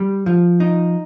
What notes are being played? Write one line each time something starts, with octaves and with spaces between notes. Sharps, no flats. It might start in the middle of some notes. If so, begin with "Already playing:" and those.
Already playing: G3
F3
D#4